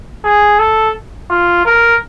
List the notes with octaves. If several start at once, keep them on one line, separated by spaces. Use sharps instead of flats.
G#4
A4
F4
A#4